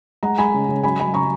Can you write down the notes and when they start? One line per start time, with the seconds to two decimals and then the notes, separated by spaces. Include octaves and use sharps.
0.23 G#3 F#5 A#5
0.38 G#3 G#5 B5
0.54 C#3
0.69 C#3
0.83 F#3 G#5 B5
0.99 F#3 G#5 B5
1.14 C#3 A#5 C#6